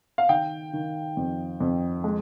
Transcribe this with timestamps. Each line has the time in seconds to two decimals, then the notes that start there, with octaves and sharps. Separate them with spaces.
0.18 F5
0.29 D#3 G5
0.73 D#3
1.17 F2
1.61 F2
2.04 G#3